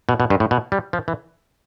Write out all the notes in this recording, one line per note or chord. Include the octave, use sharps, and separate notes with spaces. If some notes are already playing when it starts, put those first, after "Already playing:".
B2
B2
G2
A2
B2
G3
F3
E3